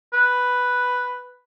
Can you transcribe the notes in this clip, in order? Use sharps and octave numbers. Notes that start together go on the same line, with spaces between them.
B4